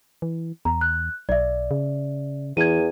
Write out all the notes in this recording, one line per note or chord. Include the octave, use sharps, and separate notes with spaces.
E3
E2 A#5
F#6
B1 D5 E5
C#3
E2 E3 G#6 D#7